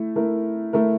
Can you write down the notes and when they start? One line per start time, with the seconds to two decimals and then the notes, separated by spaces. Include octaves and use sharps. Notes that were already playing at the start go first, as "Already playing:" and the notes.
Already playing: A3 E4
0.16 A3 E4 A#4
0.73 A3 E4 A#4